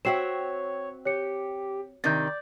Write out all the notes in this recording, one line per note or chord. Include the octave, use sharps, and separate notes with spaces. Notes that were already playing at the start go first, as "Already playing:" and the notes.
C4 F#4 C#5 E5 G5 C7 E7
G4 C#5 C#7
C3 D#3 D5 G6 A6